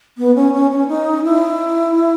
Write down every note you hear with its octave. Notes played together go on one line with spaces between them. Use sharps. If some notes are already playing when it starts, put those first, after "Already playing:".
B3
C#4
C#4
C#4
D#4
E4